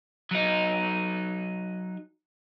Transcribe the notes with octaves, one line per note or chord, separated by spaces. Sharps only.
F#3 D#4